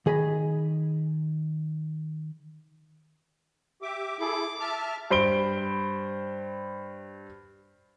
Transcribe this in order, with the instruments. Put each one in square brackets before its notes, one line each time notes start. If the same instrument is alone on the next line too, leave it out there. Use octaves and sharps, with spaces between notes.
[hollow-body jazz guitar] D#3 G#4 D#5 B5
[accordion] G4 E5 D6
[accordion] E4 G#4 A4 [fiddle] D6
[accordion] E5 A5 F6
[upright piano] G2 C5 B5 D7 G7